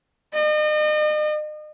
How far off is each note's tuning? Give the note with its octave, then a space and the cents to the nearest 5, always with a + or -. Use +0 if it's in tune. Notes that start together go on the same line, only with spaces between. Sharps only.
D#5 -40